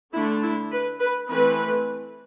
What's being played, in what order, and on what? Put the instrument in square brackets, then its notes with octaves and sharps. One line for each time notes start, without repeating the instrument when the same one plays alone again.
[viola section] D3 A3 D4 E4
E4
B4
B4
E3 A3 C4 B4